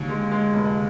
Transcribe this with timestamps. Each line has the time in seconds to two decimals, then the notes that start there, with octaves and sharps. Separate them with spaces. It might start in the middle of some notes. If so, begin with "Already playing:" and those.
Already playing: D#2 D3
0.09 G#3
0.32 G#3
0.53 F1